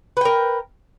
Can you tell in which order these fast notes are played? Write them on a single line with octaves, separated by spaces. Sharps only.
B4 G5 A#4